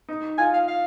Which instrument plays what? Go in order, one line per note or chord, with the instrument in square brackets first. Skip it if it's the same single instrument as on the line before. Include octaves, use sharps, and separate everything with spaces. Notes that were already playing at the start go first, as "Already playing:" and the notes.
[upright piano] D#4
[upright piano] F4 [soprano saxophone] G#5
[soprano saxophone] F5
F5